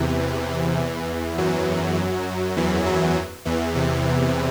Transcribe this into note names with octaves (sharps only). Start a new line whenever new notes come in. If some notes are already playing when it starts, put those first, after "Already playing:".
Already playing: E2 C3 E3
F#2 F#3
E2 E3
F#2 F#3
E2 E3
C3